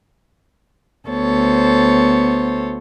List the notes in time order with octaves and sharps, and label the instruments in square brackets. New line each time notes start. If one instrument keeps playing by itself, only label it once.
[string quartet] D2 B3 A4 C5 C#5